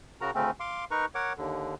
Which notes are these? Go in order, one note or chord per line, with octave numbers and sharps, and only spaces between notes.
C#3 F#4 A#4 A#5
D2 C#3 A3 C4 C#4
F5 C6 D6
D#4 A#4 B4 A#5 C#6
A#4 C#5 F#5 D6
D#2 D3